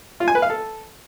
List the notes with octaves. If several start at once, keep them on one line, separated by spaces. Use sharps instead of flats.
F4
G#5
B4
F5
A4